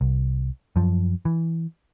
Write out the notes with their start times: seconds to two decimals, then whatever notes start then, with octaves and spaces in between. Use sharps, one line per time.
0.01 C2
0.76 F#2 F3
1.25 E3